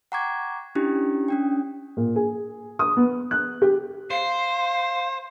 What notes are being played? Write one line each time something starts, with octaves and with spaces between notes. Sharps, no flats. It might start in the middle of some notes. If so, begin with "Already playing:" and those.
F#5 G5 A#5 C#6 D6 G#6
C#4 D4 E4 G4
C#4 D4 G5
A#2
G#4
D#6
B3
F#6
G4
C5 F5